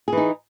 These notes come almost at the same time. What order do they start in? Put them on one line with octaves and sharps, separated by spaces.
G#4 E3 D#4